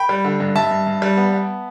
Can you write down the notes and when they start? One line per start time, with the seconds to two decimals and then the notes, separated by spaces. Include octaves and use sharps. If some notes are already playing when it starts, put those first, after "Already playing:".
Already playing: G5 B5
0.09 G3
0.24 D3
0.40 G2
0.56 G2 E5 A5
0.71 G2
0.87 G2
1.02 G3
1.17 B3
1.33 B3